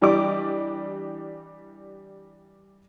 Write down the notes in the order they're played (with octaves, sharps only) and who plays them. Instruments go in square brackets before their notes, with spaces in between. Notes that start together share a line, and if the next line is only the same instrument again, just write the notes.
[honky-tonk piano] E3 G3 D4 G4 D#5 D6